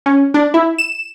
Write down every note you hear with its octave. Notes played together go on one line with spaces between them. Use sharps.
C#4
D4
E4
E7